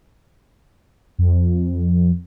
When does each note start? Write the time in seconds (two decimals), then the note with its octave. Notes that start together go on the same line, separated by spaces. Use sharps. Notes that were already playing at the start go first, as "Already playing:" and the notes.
1.18 F2